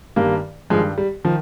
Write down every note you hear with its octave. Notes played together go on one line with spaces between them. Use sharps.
G2 D#3 G3 A#3
G2 D#3 F3 G#3
G3
D#3 F3